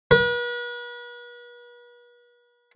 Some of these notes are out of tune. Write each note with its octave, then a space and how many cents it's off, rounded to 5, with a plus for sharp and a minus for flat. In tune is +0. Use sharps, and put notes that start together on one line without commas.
B4 -40